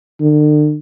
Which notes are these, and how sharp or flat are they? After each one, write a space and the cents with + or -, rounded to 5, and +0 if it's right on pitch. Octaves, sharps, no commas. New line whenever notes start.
D3 +40